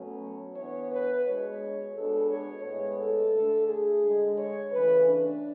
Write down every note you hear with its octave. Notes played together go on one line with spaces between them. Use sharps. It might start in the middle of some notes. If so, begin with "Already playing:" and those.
Already playing: B2 F#3 A3 C#4
E3 B3 D4 C#5
B4
B2 G#3 D4 C#5
B2 G#3 B3 D4 A4
C#5
A2 G#3 B3 C#5
A4
D3 A3 D4
G#4
D3 G#3 D4
C#5
C#3 E3 A3 C#4 B4
D4